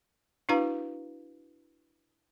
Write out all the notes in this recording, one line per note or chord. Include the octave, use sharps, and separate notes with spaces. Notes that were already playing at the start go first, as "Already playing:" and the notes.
D4 E4 F#4 B4 F5 A#5